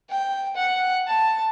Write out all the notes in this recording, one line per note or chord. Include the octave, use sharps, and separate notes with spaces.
G5
F#5
A5